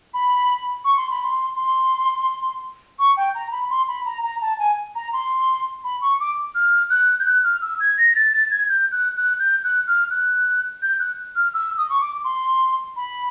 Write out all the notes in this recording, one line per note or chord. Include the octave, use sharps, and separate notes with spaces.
B5
C#6
C6
B5
C6
C6
C#6
G5
A#5
B5
C6
B5
A#5
A#5
A5
G#5
A#5
C6
B5
C#6
D6
F6
F#6
G6
F#6
F6
E6
G#6
A#6
A6
A6
G#6
G6
F#6
F#6
G6
F#6
F6
F#6
G6
F#6
F6
E6
D#6
C#6
D6
C6
B5